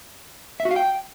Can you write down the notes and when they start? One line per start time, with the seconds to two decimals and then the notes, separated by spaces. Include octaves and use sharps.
0.60 E5
0.65 F#4
0.71 F5
0.76 G5